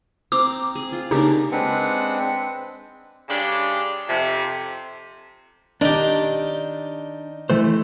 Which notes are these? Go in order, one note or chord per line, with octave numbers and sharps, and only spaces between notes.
C4 A#5 D6
G#4
F4
C#3 A#3 D4 D#4 G4
G#3 C4 D4 B4 F#5
C#3 G#3 D4 G4
F2 C3
D#3 D4 G4
E3 A3 C5